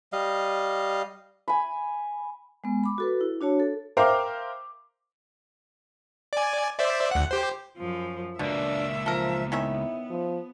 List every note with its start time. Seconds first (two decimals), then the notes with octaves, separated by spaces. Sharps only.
0.13 G3 D#5 F5
1.48 G#5 B5
2.64 G#3 B3
2.84 B5 D6
2.98 F#4 A4 B4
3.21 E4
3.41 D4 F#4 C#5 A5
3.60 A4
3.97 A#4 C5 E5 F5 G5 D6
6.33 D5 G#5
6.79 C5 D5 E5
7.11 D2 F#5
7.31 G4 C5
7.77 F#2 F3
8.39 C#2 B2 A#3 D4 E5
9.06 F3 A4 A#4
9.52 D#3 B3 C#4 E4 E5
10.10 F3